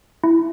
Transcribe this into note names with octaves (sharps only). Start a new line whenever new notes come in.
E4